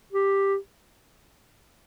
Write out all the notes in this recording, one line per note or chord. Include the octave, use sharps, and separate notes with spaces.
G4